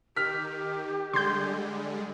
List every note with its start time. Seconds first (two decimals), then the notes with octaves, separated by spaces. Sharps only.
0.16 D#3 G4 F6 B6
1.13 D3 G3 G#3 C6 G6